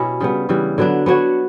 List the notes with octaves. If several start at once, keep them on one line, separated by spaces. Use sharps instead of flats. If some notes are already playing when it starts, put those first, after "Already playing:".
Already playing: B2 C#4 E4 G4
C#3 G3 B3
C#3 E3 G3
D3 F#3 B3 D4
B3 D4 F#4 C#5